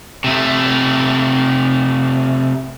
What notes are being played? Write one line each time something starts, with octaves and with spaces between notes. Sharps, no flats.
C3 A3